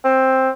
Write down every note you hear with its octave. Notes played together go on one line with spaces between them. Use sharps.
C4